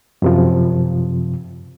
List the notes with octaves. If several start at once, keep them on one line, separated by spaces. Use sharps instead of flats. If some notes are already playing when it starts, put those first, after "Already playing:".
F#2 C3 F3